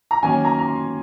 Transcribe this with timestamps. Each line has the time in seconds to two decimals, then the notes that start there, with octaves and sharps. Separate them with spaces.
0.11 A#5
0.23 D#3 F#3 A#3 C#4 G#5
0.45 A#5
0.59 A#5
0.68 C6